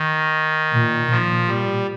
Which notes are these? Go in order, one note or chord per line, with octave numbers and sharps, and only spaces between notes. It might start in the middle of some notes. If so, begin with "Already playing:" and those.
Already playing: D#3
A#2
A#2 F3
G3